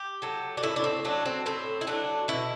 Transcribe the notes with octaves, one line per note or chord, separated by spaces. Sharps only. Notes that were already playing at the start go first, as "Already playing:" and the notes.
Already playing: G4
F#3 A3
D4
A2 E4
D4
C4
F#3 A3 D4
C4
A2 C4
E4
F#3 A3 D4
B2 E4